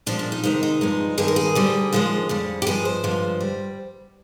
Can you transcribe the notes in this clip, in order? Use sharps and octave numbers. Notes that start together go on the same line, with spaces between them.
A#2 F3 G#3 D4
D4
D#4
D2 C3 D#3 G#3 D#4
D#4
G2 F3 G#3
G2 D#3 G#3 G#4
A#4
G#4
D2 D3 G3
D#2 D3 F3 G#3
F2 D3 G3
G4
G2 F3 G#3 G#4
C5
G2 D3 F3 G#3
G3